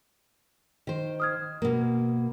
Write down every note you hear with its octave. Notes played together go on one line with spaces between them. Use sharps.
D#3 C5
D#6 F6 G#6
B2 A#3 A#4